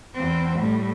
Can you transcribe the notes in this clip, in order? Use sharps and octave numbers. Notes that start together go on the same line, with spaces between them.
E2 C4
A2 G3